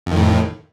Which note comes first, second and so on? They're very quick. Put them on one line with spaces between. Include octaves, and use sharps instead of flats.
F2 D#3 A2